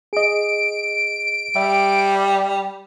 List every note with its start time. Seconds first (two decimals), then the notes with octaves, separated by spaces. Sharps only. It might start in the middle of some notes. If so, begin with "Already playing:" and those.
0.13 G#4 D#5 D7
1.56 G3 E5